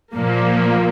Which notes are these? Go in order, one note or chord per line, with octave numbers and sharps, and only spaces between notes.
A#2 F3 A#3